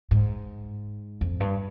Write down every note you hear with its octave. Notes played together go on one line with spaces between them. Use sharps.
G#2
F2
G2